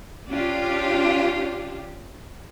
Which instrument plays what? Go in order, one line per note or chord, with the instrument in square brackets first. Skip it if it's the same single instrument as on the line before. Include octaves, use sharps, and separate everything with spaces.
[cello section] C#4 D4 F4 G4